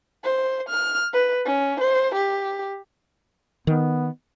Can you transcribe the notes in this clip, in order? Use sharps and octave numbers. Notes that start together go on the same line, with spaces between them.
C5
F6
B4
C#4
C5
G4
D#3 B3